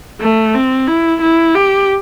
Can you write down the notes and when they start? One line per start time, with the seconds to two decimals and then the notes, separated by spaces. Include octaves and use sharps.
0.21 A3
0.54 C4
0.87 E4
1.21 E4
1.55 G4